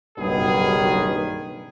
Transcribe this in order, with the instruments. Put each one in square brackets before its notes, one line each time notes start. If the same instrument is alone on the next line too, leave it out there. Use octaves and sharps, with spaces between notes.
[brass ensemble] F#1 B1 G2 D#3 B3 G#4